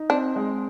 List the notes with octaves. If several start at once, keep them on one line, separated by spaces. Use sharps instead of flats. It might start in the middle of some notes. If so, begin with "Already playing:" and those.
Already playing: D#4
C4 D4
G#3